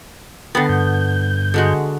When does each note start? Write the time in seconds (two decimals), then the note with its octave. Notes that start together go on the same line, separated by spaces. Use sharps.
0.55 D3 B3 G5 B5 A6
0.69 G2 G6
1.54 D3 G#3 F#4